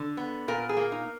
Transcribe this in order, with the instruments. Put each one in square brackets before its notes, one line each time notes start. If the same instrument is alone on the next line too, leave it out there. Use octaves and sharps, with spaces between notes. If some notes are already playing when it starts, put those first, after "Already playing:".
Already playing: [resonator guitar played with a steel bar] D3
B3
A#2 A#4
G#4
A#3
D#4